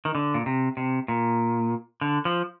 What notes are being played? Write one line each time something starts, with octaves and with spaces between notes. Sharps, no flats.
D#3
D3
A#2
C3
C3
A#2
D3
F3